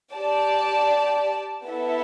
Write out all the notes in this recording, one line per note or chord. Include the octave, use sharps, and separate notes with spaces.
G4 D5 A5
B3 E4 A4 E5